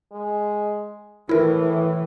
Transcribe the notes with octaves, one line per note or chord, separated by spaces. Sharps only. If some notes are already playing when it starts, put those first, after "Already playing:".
G#3
A2 E3 E4 A#4